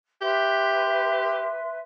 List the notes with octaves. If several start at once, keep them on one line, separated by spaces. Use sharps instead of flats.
G4 B4 E5 C6